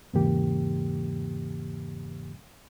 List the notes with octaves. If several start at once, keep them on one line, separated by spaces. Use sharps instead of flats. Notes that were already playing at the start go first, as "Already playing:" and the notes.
E2 G#2 C#3 E3 A#3 G4